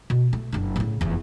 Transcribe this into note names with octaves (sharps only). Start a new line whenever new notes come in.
B2
A3
F#1 D4
A2 C#3
F1 E2